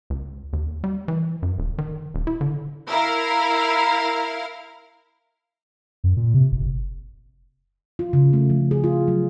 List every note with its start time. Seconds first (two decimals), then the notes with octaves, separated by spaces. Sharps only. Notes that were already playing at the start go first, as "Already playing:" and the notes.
0.10 C#2
0.53 D#2
0.84 G3
1.08 E3
1.43 F#2
1.58 D#1
1.78 D#3
2.14 D#1
2.27 E4
2.41 D3
2.89 E4 A#4 F5
6.04 F#2
6.17 A#2
6.34 C3
6.52 F#1
7.99 F4
8.13 C#3
8.33 A3
8.50 F3
8.71 G#4
8.84 F4
9.08 F#3